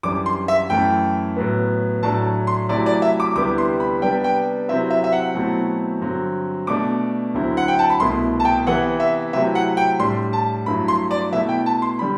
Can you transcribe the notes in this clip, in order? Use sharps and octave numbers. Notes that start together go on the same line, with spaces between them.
F#2 E3 G3 D4 D6
C6
E5
F#2 E3 A3 E4 G5
A2 F#3 B3
A2 F#3 A3 D4 A5
C6
C3 F#3 A3 E4 D5
D5
E5
D6
D2 C3 G3 B3 E4 D6
C6
B5
C3 G3 B3 D4 G5
G5
C3 F#3 C4 E4 E5
E5
E5
F#5
B2 F#3 A3 C4 E4
G2 D3 F#3 C4
B2 A3 D4 D6
D2 D3 F#3 C4 E4
F#5
G5
A5
B5
C2 B2 A3 E4 C6
A5
G5
C3 E3 B3 E4 F#5
E5
C3 F#3 A3 C4 E4 E5
F#5
G5
A2 G3 D4 C6
A5
G2 F#3 A3 E4 B5
C6
D5
B2 A3 E4 E5
G5
A5
C6
D3 G3 B5